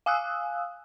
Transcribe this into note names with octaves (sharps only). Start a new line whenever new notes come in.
F5 G#5 D#6 E6 F#6